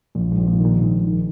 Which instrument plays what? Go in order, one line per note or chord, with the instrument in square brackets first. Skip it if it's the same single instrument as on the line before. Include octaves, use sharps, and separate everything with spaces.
[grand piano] A#1 [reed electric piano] A#2
[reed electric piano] G#2
[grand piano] A#1
[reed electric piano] A#2
[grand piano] D#3
[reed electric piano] A#2
[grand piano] A#1 [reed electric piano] G#2
[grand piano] D#3